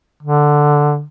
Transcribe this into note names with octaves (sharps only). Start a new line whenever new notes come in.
D3